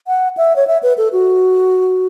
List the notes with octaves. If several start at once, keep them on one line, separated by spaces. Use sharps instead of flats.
F#5
E5
C#5
E5
B4
A4
F#4